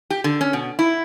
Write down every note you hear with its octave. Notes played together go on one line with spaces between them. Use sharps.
G4
D3
C#4
B2
E4